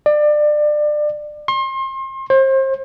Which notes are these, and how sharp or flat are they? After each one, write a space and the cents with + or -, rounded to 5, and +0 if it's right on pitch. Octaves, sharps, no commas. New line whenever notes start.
D5 +25
C6 +35
C5 +35